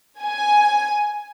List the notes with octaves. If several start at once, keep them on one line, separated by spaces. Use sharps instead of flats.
G#5